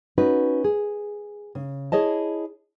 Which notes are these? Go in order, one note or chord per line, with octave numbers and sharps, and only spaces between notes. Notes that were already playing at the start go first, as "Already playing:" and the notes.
C#4 D#4 F#4 B4
G#4
C#3
E4 G#4 C#5 D#5 A5